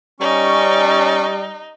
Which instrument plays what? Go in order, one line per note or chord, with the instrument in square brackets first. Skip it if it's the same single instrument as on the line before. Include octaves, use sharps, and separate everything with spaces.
[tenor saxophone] G3 [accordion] C#4 C#6 [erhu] D#4